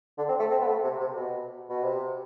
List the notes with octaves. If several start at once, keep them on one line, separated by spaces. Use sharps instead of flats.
D3
C4
A3
C4
B3
A3
C3
C3
B2
B2
C3